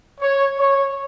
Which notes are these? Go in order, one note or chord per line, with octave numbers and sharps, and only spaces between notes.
C#5
C#5